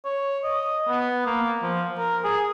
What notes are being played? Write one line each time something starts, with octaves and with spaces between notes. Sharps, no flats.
C#5
D#5
B3
A#3
F3
A#4
G#4